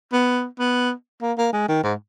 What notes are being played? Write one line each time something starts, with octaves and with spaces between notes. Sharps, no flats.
B3
B3
A#3
A#3
G#3
D#3
G#2